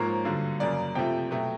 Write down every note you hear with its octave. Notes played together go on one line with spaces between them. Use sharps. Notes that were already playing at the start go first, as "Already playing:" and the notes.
Already playing: G#2 F3 A#3 C#5
G2 D3 F#3
F#2 C#3 F#3 A#3 D5
F2 C3 F3 A3 G5
B2 F#3 A3